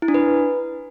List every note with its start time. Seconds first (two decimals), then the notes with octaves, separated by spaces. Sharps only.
0.02 E4
0.08 D4
0.14 B4